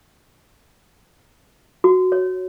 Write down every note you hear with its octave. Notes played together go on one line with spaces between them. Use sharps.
F#4
C#5